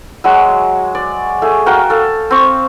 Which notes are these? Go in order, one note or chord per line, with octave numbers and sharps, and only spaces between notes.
F#3 G#3 F#4
D5
A3 G#4
F#4 A#4 F5 G5
A4 F5
C4 C#6